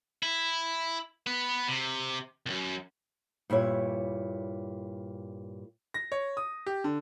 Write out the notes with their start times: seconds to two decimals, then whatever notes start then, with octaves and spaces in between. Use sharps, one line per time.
0.23 E4
1.27 B3 B4
1.68 C3
2.46 C2 F#2
3.50 G2 A#2 E4 C#5
5.94 A#6
6.12 C#5
6.37 D#6
6.66 G4
6.84 D3